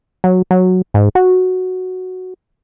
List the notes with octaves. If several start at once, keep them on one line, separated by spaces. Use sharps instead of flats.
F#3
F#3
G#2
F#4